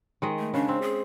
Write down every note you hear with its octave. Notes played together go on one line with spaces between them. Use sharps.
D#3 G#3 D#5
A3
C#3 D4
C4
G#4